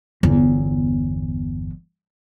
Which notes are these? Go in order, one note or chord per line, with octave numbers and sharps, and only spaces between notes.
G1 E2